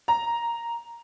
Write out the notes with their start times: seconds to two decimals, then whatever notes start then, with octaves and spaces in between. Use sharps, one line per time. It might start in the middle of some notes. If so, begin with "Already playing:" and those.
0.08 A#5